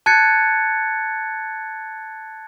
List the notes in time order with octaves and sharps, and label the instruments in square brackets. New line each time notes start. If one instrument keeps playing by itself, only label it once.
[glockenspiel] A5 F#6 G#6 A6 C#7